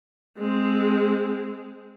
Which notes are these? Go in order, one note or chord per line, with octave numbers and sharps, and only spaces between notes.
G#3 C4